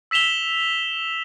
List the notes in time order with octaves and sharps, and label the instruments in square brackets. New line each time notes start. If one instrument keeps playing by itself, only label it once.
[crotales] E6 B6 E7 F7 G7